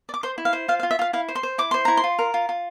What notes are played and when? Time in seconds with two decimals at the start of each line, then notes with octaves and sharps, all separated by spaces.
0.09 D5
0.14 D6
0.23 C5 C6
0.38 E4
0.45 F5
0.53 C5
0.68 F4 F5
0.79 F5
0.83 F4
0.91 E5
0.99 F4 F5
1.13 E4 F5
1.28 C5
1.35 C6
1.43 C5
1.58 E4 D6
1.71 C5 C6
1.85 E4 A#5
1.97 C6
2.04 F4
2.19 A#4
2.34 F4
2.49 F4